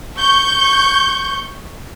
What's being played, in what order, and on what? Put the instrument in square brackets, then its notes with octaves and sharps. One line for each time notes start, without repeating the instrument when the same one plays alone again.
[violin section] C#6 G6